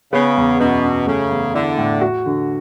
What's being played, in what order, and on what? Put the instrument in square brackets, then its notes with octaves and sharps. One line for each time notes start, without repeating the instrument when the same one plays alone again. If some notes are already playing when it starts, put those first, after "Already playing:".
[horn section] C#3 [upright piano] B3
[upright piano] E2
[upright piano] F#2 [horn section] B2
[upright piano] F#2
[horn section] C#3 [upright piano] A3
[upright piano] E2
[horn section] D3 [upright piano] E4
[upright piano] A2
F#4
D3